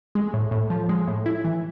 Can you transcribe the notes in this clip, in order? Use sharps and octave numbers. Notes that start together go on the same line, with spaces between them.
G#3
A2
A2
F3
G#3
A2
E4
E3